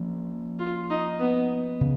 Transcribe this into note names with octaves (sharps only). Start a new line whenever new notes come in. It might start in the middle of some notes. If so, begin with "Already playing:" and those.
Already playing: F3 A#3 C#4
F4
D#4
B3
C#3